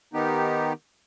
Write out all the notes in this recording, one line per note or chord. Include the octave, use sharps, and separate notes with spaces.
D#3 B3 D#4 G4